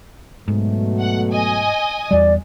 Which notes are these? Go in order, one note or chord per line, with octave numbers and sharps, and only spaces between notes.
G#2 B2 F#3 A3
F#5
D#5 G#5
E2 G3 D5